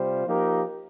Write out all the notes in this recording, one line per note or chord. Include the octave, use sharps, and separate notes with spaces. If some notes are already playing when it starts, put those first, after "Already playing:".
Already playing: C3 G3 F4 C5
F3 A#3 D#4 G4 A#4